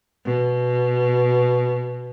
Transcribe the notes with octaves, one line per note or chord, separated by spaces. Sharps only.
B2